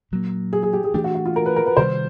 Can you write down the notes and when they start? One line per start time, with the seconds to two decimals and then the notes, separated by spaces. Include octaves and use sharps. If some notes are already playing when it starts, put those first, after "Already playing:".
0.12 A#2 F#3 A#3
0.53 G#4
0.63 G#4
0.73 G4
0.84 G#4
0.94 E3 A3 D4 G4
1.04 F#4
1.15 F#4
1.26 F4
1.36 A#4
1.46 B4
1.56 A#4
1.66 B4
1.77 C3 D#3 G3 C5